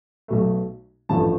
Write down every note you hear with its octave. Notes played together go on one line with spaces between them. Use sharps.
B1 B2 A3
A1 G2 F3 A3 A5